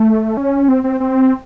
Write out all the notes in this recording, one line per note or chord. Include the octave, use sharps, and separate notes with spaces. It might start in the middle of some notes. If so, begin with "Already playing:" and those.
Already playing: A3
C#4
C4
C4
C4